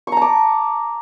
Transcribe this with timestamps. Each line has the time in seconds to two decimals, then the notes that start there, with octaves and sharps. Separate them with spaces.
0.07 C#6
0.12 A#5
0.17 A5
0.22 D6